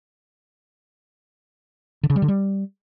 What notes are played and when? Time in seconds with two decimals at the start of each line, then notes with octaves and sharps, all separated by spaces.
2.03 D3
2.10 C#3
2.16 G3
2.22 D3
2.28 G3